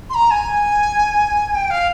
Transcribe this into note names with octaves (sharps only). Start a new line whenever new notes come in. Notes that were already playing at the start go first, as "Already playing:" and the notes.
C6
A#5
G#5
G5
F5